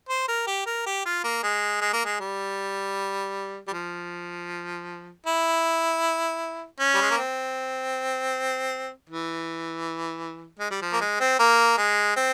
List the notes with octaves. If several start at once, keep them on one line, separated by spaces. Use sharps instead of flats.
C5
A#4
G4
A#4
G4
F4
A#3
G#3
G#3
A#3
G#3
G3
G3
F3
E4
C#4
G3
G#3
A#3
C4
E3
G#3
G3
F3
A#3
G#3
C4
A#3
G#3
C4